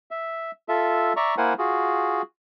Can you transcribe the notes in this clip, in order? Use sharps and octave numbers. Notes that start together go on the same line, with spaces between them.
E5
F4 A4 E5
D5 E5 A#5 C#6
A#3 E4 A#4 C5 F#5 G#5
F4 F#4 G#4